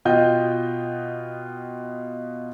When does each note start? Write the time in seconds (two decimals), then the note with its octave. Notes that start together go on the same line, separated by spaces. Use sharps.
0.05 B2 F4 D#5 G5 G6